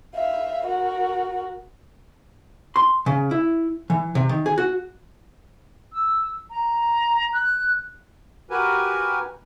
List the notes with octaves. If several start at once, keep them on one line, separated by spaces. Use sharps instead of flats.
E5 F5
F#4 A#4
C6
C#3
E4
E3
C3
D#3
G#4
F#4
E6
A#5
F#6
F#4 G4 A#4 B4 G#5